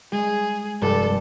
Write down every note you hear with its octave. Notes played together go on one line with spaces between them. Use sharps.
G#3 G#4
F1 G2 A4 D6